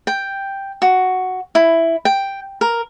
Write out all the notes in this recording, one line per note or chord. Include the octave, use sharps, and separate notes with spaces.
G5
F#4
E4
G5
A#4